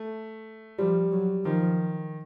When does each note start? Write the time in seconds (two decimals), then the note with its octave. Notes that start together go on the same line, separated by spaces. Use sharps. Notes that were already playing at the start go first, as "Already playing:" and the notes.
Already playing: A3
0.78 F3 G3
1.12 F#3
1.45 D#3 F3